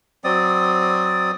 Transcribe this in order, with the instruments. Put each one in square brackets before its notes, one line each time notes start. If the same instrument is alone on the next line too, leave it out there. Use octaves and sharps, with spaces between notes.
[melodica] F#3 C4 D5 D#6